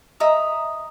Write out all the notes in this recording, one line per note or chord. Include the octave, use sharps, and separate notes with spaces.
D#5 E5 A#5 D#6